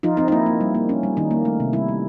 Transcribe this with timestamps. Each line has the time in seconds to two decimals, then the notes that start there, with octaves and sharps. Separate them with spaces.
0.03 F3 D#4 F4
0.17 C4 D#4
0.28 D#4
0.32 A#3 E4
0.46 A#3
0.61 G3
0.75 A#3
0.89 C#4
1.03 G3
1.17 D#3 D#4
1.31 A#3
1.45 A3
1.60 C3
1.73 G3 E4
1.88 G3